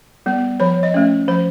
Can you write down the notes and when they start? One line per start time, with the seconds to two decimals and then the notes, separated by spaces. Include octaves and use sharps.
0.26 G3 B3
0.60 F3 C#5
0.83 D#5
0.94 A3 C#4
1.28 F3 C5